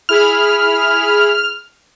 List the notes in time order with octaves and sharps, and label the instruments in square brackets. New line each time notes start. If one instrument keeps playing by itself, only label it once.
[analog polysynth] E4 G#4 B5 [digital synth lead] F6